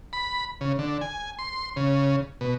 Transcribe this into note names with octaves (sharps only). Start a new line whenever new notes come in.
B5
C#3
D3
G#5
C6
C#3
B2